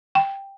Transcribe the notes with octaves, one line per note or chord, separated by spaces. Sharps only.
G5